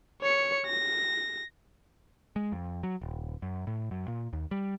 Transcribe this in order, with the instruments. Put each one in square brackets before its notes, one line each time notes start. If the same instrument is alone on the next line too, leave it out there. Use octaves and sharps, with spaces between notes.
[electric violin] C#5 C#7
A#6
[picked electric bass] G#3
F2
F#3
D#1
F#2
A2
F#2
A#2
D#2
G3